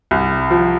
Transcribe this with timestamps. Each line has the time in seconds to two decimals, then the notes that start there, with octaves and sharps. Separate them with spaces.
0.11 C2
0.50 F3